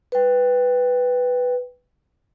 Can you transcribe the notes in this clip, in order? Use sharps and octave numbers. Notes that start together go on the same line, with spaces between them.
B4 G5